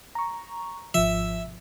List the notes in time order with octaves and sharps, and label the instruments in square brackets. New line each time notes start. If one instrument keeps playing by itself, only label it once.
[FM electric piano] A#5 C#6
[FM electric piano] G#1 F3 [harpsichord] E5